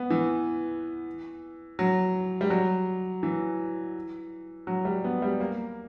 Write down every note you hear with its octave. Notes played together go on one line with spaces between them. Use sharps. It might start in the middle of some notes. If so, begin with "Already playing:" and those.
Already playing: B3
E3
F#3
G3
F#3
E3
F#3
G3
B3
G3
A#3